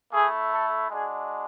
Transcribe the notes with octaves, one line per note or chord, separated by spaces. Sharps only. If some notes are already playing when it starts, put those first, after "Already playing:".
A3 E4 G#4
A4
G#3 D4 F#4 G#4